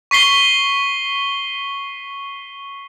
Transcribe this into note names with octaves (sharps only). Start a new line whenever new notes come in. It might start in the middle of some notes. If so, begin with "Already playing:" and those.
C#6 B6 C7 G7